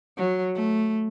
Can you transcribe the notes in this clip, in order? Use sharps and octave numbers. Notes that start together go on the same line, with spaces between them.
F#3
A3